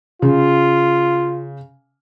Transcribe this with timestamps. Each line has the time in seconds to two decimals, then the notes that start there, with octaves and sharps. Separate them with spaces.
0.22 C#3 F4